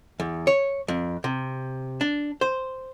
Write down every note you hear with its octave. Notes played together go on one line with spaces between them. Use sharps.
E2
C#5
F2
C3
D4
C5